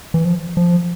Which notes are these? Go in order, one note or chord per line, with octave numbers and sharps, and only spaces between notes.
E3
F3
F3